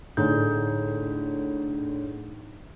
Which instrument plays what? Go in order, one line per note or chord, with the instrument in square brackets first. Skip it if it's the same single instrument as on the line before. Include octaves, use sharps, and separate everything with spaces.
[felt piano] A2 D3 [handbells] D#4 G#4 G6